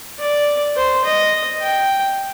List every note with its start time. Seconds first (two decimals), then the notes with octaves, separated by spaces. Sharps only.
0.20 D5
0.76 C5
1.05 D#5
1.62 G5